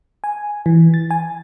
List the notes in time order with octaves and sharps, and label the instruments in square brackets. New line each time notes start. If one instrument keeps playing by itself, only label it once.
[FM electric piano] G#5
E3
A6
G#5